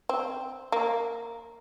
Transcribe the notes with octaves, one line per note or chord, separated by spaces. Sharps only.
C4
A#3